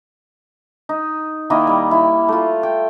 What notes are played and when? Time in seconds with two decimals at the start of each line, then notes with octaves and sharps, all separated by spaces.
0.89 D#4
1.50 D#3 A#3 E4 D#5
1.67 G3 D#5
1.91 E4
2.28 A3 F4
2.63 G5